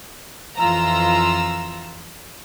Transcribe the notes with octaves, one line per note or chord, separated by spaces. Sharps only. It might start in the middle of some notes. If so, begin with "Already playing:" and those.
F2 E3 F4 A#5 E6